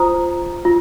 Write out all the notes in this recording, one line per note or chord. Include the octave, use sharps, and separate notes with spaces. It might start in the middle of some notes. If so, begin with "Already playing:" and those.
Already playing: F4 C5 A#5 D#6
F4